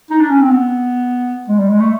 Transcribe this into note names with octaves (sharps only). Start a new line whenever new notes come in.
D#4
D4
C#4
C4
B3
G#3
G3
G#3
A3